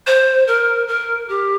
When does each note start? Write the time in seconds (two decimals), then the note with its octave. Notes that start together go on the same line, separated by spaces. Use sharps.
0.07 C5
0.47 A#4
0.88 A#4
1.29 G4